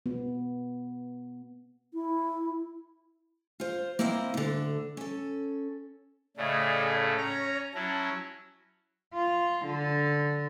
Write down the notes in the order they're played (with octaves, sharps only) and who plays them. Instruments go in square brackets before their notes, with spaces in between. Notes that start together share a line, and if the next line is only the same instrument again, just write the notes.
[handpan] B3
[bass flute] E4
[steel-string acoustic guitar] F4 C5
A#3 C4 E4 C5 D5 D#5
D2 D3
C#4 A4
[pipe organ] A2 C#3 A3 [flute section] G#4 D5 D#5
[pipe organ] C#4 A#5 [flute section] C#5
[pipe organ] F#3 C#4 E4 [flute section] A5
[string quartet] F4
D3